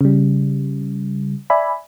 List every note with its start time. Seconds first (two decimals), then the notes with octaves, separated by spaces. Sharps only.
0.01 C#3 G3
1.50 D5 E5 G#5 B5